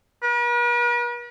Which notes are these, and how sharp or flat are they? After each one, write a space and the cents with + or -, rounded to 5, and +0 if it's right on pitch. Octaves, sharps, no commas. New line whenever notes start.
B4 -45